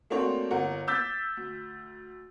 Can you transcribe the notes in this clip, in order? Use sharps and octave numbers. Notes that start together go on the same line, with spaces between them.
A3 A#3 C4 D4 F#4 C#5
G1 A#4 F#5
D6 E6 G6 A6 B6
D2